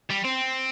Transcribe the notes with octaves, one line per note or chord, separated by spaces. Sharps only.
G3
C4